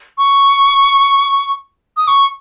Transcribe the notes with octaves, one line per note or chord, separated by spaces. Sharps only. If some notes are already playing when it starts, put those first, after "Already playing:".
C#6
D#6
C#6